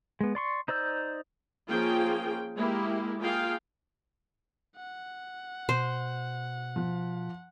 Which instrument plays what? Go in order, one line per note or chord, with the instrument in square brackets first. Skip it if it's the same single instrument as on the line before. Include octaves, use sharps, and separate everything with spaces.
[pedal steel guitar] G#3 B3
D5 C6 C#6
D#4 C5 D5 E6 G6
[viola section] F3 A#3 C#4 F4 G#4 G5
G#3 A#3 E4 G4
A#3 F4 G#4 F5 G5
[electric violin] F#5
[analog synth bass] B2 [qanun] C5
[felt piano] F3